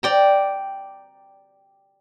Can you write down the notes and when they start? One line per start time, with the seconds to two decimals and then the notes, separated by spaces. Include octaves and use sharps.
0.03 D5 G5 A#5